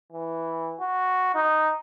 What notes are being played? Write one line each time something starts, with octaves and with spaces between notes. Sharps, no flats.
E3
F#4
D#4